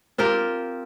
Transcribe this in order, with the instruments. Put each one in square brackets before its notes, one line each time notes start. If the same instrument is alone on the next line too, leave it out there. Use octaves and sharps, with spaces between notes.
[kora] C4 F4 G4 A#4